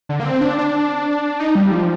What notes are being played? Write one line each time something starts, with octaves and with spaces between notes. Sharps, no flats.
D3
A#3
C4
D4
D4
D#4
G3
F3